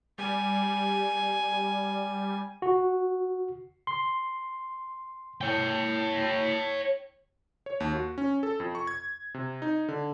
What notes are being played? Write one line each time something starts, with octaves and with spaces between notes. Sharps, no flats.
G3 G#5
F#4
C6
C#5 G5
C#5
D#2
F#4
C#4
A4
F2
C#6
G#6
C3
D#4
D3